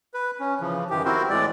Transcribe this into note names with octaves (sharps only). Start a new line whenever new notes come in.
B4
C#4
C#3 E3 F3
F#2 D#3 E3 G4
C4 E4 F#4 A#4 C5
A2 E3 G#3 D5